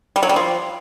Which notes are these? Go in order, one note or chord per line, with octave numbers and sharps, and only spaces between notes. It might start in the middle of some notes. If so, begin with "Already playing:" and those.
G3
F#3
G3
F3